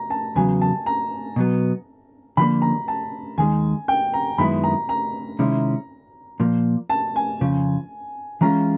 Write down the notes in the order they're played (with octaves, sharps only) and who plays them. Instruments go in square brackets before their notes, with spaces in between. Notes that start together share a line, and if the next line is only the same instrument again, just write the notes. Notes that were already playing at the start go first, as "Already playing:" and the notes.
Already playing: [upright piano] A#5
A5
[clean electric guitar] E2 C#3 F#3 B3 [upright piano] G#5
[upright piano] A5
A#5
[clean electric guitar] B2 F#3 B3
[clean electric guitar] D3 F3 A#3 [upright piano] B5
[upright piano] A#5
A5
[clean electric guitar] D#2 D#3 G#3 [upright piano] G#5
[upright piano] G5
A#5
[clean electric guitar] F#2 D#3 G#3 B3 E4 [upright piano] B5
[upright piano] A#5
A#5
[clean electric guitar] C3 D#3 G#3 C#4 E4
A#2 F3 A#3
[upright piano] A5
G#5
[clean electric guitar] F2 C#3 F3
[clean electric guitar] E3 G#3 C#4 F4 G#4 [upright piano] A#5